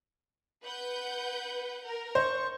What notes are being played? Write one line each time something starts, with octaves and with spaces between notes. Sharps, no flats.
B4 F#5 G6
A#4
C5 C#6